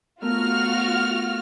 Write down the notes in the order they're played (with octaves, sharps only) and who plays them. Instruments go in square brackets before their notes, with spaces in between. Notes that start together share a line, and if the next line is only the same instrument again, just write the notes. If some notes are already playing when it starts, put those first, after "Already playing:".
[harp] A3 B3 A#4 [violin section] F4 F#4 F6